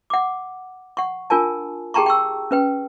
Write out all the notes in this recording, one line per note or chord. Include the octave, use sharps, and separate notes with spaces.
F#5 D6
F#5 C#6
D4 F4 A#4 G#5 A5
G4 G#4 G5 A5 A#5 C#6
G5 C#6 E6
C#4 B4 G5